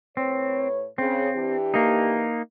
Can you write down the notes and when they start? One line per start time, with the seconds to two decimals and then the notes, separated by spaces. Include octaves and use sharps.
0.17 A2 C4 B4 C#5
0.98 C#3 C4
1.35 E3 D4 G4
1.74 A#3 D#4